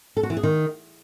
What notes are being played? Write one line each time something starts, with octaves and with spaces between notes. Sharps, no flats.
A4
F#4
E3
G#4
D#3